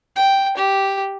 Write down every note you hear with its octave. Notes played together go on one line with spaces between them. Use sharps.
G5
G4